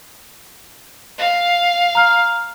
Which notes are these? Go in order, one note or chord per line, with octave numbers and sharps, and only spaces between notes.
F5
A#5 F6